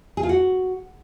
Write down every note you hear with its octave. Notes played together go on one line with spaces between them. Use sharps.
G#4
F4
F#4